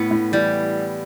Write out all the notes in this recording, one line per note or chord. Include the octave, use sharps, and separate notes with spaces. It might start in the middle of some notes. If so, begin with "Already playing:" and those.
Already playing: A2 B3
A2
E3 G3